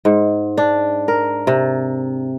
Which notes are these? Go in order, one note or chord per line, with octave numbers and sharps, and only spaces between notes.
G#2
D4
A#4
C3